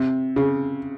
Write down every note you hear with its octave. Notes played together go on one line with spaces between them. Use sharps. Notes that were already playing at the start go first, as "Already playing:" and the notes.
Already playing: C3
C#3